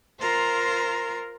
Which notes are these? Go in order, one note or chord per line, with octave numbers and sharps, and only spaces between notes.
F4 A#4 C5 A#5